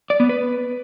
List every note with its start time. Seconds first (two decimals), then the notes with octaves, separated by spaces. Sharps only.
0.10 D5
0.20 B3
0.29 B4